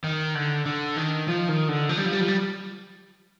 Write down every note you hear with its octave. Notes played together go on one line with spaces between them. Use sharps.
D#3
D3
D3
D#3
F3
D#3
D3
F3
G3
F3
G3
F3
G3